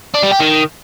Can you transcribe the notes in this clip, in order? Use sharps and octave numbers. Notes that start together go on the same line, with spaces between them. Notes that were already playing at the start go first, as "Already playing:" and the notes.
D4
G3
G4
D#3